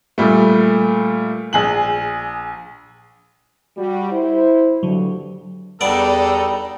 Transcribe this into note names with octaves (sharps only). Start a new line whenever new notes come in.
A#2 G3 A3
A#1 G#4 F#7
G3 F#4
E4 C5
D2 G2 D3 F#3
E2 G3 B3 D4 D#4 A4 D5